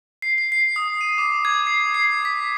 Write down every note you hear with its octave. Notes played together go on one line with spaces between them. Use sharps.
C7
C7
C7
D#6
D#7
D6
G#6
C7
C7
B6